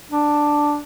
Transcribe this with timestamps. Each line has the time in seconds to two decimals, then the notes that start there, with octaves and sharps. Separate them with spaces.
0.11 D4